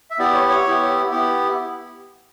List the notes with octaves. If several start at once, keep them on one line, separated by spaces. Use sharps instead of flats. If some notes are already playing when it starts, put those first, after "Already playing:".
E5
B3 E4 G4 D5
C#5
C#5
B3 E4 G4
B3 E4 G4